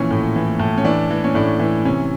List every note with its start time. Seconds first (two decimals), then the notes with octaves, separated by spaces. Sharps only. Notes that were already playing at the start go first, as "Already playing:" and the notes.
Already playing: A#2 E3 F3 C#4
0.11 A2
0.36 E3
0.60 A2
0.78 C#4
0.84 E3 D4
1.10 E3
1.24 C#4
1.35 A2 D4
1.59 E3
1.85 C3 C#4